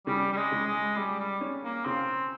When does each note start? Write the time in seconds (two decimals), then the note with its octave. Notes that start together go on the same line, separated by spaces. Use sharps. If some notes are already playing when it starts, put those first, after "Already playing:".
0.07 C#3 G3
0.33 G3
0.37 G#3
0.52 C#3
0.67 G#3
0.96 G3 G#3
1.19 G3
1.41 C#4
1.64 A#3
1.86 C#3 C4